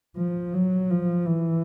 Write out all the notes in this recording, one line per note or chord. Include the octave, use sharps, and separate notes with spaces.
F3
F#3
F3
E3